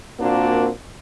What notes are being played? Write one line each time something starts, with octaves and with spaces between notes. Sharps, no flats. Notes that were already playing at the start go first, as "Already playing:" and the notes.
A#2 A#3 C4 D4 F#4